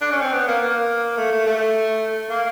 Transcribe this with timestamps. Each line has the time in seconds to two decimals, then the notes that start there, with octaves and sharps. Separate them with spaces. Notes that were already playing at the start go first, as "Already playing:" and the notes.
0.01 D4
0.11 C#4
0.21 C4
0.33 B3
0.47 A#3
0.61 A#3
1.17 A3
1.31 A3
1.46 A3
2.30 A#3